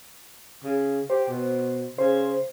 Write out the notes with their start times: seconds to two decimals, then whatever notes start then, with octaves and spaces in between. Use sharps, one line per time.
0.64 C#3
1.10 G4 C5
1.28 B2
1.98 C#3 C5